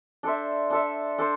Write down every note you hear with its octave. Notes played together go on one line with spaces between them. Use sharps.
D4 A4 C5 E5
D4 A4 C5 E5
D4 A4 C5